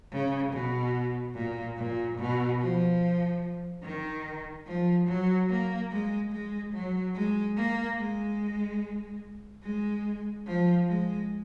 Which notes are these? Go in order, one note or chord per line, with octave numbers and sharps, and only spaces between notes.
C#3
B2
A#2
A#2
B2
F3
D#3
F3
F#3
A#3
G#3
G#3
F#3
G#3
A#3
G#3
G#3
F3
G#3